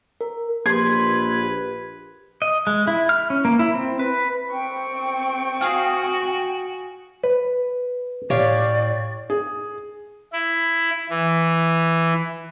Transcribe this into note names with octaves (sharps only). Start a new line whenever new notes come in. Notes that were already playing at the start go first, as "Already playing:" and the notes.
A#4
A#1 G4 B4 C6 G#6
D#5
G#3
E4
F6
C#4
A#3
E4
C4
B4
C4 G5 C#6
F#4 G#4 F5
B4
A2 G4 C#5 D5 F5
G#4
E4
E3